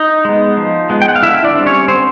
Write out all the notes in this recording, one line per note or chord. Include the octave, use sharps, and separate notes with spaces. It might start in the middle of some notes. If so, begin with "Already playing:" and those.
Already playing: D#4 D#5
G#3 B3
F3
G#3 B3
G5
F#5
F5
D3 E4 E5
D4 D5
G3 C4
C#4 C#5
D3 C4 C5